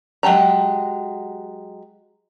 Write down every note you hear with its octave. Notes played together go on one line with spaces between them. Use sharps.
F#3 G#3 G4 A5 A#5